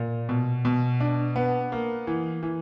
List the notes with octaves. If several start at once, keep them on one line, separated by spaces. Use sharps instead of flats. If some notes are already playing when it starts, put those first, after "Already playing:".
Already playing: A#2
B2
B2
D4
B3
A#3
E3
E3